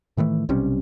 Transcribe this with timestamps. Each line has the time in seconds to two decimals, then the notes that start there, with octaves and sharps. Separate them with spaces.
0.17 A2 D#3 E3 A3
0.49 B1 C3 G3 C#4